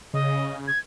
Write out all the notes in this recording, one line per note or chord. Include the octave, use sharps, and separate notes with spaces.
C#3 D#5
G#6